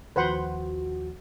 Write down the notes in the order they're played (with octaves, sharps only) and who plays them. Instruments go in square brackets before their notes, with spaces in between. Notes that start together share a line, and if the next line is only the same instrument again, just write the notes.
[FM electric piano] D#2 F3 F#4 [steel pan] B4 C5 F#5